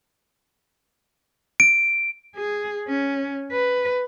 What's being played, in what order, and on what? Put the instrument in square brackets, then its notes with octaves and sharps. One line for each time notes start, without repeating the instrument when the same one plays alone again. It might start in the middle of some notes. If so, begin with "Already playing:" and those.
[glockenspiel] D7
[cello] G#4
C#4
B4